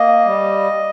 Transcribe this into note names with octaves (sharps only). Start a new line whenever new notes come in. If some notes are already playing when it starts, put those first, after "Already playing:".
Already playing: A#3 D#5
G3